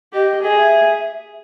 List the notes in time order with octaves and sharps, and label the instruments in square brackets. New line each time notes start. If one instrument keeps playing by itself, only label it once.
[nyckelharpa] G4 [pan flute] D#5
[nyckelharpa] G#4 [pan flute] D#5
[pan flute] E5